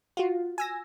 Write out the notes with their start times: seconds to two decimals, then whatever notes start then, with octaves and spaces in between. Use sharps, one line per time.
0.17 F4 F#4
0.58 G#5 E6 A#6